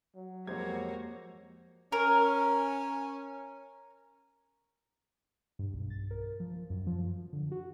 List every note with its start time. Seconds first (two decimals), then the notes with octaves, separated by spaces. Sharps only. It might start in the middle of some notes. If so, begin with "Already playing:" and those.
0.16 F#3
0.47 F2 G#3 A#3 F#4 G4 C5 C#5 G#6
1.92 C#4 A#4
5.59 G2
5.73 B1
5.90 A6
6.11 A#4
6.40 F3
6.70 F#2
6.87 F3
7.33 D3
7.51 F#4